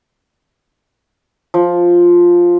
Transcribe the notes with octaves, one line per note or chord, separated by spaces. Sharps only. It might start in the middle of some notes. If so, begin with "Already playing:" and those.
F3